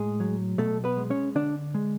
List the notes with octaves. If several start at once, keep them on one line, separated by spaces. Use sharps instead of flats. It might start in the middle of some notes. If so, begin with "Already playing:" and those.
Already playing: A2 G#3 G#4
F#3
B2 A3 A4
B3 B4
G#3
C#4 C#5
D3 D4 D5
G#3